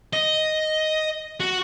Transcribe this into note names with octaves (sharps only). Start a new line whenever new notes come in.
D#5
F#4